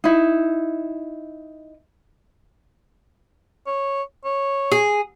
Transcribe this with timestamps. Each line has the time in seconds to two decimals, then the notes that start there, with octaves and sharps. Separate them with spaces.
0.04 D#4 E4
3.67 C#5
4.25 C#5
4.72 G#4